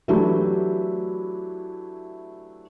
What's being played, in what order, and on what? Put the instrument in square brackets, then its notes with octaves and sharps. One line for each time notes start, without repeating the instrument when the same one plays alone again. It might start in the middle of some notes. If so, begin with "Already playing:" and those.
[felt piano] E3 F#3 A3 D4 E4 G4